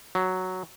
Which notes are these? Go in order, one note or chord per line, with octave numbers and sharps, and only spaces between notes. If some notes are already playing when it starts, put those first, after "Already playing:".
F#3